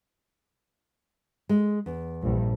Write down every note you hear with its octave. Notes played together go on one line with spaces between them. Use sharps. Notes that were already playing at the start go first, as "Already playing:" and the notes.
G#3
E2
A#1 G2